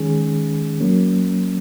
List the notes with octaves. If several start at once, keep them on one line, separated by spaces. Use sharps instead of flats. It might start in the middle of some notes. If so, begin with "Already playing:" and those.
Already playing: D#3 G#3 C#4 G#4
F#3 A#3 C#4